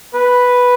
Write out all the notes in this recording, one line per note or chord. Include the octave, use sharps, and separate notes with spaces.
B4